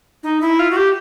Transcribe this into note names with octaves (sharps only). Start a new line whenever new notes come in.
D#4
E4
F4
F#4
G4